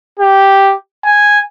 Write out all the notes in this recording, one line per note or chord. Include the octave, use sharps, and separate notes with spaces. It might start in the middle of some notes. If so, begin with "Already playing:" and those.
G4
G#5